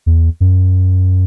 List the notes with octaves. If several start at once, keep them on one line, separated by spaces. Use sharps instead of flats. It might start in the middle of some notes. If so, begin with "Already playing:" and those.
E2
F#2